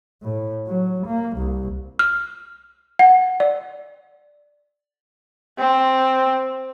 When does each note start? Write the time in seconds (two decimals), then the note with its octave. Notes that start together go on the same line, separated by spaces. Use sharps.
0.23 A2
0.67 F#3
1.06 A#3
1.37 C2
1.99 F6
2.99 F#5
3.40 D5
5.58 C4